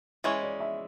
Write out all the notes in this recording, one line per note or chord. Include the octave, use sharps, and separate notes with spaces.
E3 G#3 C#4 C#5
D5
E5